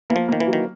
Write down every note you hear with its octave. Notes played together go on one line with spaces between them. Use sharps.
E3 A#3
F3
D#3 A#3
E3
F#3
D#3